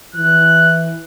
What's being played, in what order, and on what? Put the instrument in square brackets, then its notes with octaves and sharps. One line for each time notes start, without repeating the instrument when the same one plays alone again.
[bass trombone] E3 [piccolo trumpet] F#6